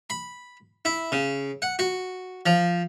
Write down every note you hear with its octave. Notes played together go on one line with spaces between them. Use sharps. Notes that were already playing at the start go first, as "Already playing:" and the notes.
B5
E4
C#3
F#5
F#4
F3